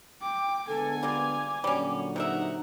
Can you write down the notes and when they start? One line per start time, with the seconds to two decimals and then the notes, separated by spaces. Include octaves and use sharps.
0.22 G5 D6
0.68 D3 G#3 B3 A4 G#5
1.03 G3 A#3 F4 D6
1.64 A#2 D3 F#3 G3 C#4
2.16 C3 D#4 A#4 E5 F#5